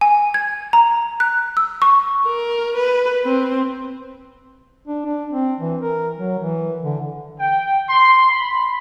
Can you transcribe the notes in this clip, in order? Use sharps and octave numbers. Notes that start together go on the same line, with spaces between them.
G#5
G#6
A#5
F#6
E6
C#6
A#4
B4
C4
D4
D4
C4
E3
A#4
F#3
E3
D3
G5
C6
B5